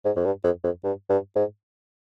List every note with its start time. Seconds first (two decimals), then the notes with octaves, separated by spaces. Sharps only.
0.05 G#2
0.16 F2
0.25 G2
0.44 F2
0.64 F2
0.84 G2
1.09 G2
1.36 G#2